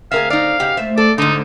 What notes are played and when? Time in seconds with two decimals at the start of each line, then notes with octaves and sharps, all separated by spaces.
0.11 D3 C4 G#4 A#4 E5 F5
0.30 D#4 D5 F5
0.60 C#3 D#4 F#4 G4
0.77 A3 C5 E5
0.98 A4 D5
1.18 D#2 G#2 D3 A3 D#4 C5